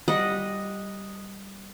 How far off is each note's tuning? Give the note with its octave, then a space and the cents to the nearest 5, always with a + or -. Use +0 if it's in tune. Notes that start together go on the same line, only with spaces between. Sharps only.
G3 +0 D#5 +0 F#5 -15